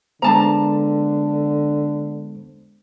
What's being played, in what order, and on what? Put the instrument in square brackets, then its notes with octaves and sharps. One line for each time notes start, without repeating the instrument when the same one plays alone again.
[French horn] D3 [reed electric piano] G#3 B3 C5 [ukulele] D4 A5 A#5